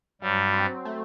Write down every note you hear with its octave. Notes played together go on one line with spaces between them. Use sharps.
G2 F#3 G3
C4
A3